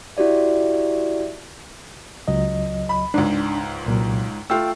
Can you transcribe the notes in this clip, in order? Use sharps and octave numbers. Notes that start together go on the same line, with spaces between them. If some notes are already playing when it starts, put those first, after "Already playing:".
E4 F#4 G4 D5 E5
C#2 F#3 D#5
B5
C#2 G#2 D4
C2 A#2 F#3
A3 F4 G5 E6